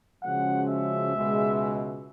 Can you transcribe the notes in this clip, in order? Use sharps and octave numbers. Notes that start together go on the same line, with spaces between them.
C#3 F3 G#3 C#4 F#4 F#5
E5
C#2 B2 G#3